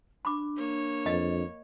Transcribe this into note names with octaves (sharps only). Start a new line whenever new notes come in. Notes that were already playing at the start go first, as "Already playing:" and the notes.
D4 B5 D6
A#3 C#5
F2 D#5